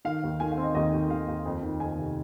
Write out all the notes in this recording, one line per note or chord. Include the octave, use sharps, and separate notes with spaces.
D#3 F5
D#2
D#3 G#5
F5
C4
D#5
D#2 D#5
D#2
D#2 F5
D#2
F2
D#3
F2 G#5
C3